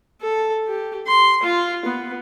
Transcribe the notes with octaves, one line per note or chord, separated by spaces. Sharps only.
A4
G4
C6
F4
B3